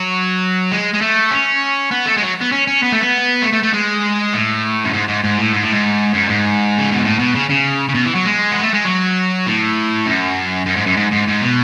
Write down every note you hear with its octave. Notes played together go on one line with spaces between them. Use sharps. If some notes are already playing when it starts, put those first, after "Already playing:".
Already playing: F#3
G#3
G#3
A3
C#4
B3
A3
G#3
F#3
B3
C#4
C#4
B3
A3
B3
A3
A3
A3
G#3
A2
F#2
G#2
G#2
G#2
A2
G#2
A2
G#2
F#2
G#2
C#3
B2
A2
B2
C#3
C#3
C#3
B2
E3
F#3
G#3
B3
A3
G#3
F#3
A2
F#2
F#2
G#2
F#2
G#2
G#2
G#2
B2